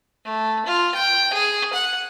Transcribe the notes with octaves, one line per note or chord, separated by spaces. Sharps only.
A3
F4
G5
G#4
F#5